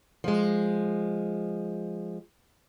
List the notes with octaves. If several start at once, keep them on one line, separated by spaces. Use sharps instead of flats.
F3 G#3